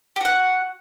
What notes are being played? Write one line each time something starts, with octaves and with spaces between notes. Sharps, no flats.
F#4 G4 F#5